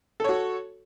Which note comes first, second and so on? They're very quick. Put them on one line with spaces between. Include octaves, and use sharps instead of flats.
A4 C#5 F#4